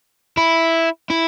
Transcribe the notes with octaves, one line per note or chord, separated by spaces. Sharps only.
E4
E4